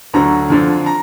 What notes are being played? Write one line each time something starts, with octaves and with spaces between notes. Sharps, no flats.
D2 D3 F#3 A#5
F2 D3 F3
A#5